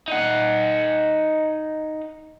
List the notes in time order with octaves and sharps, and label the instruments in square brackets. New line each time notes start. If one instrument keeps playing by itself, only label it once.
[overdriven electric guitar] D#4 F#5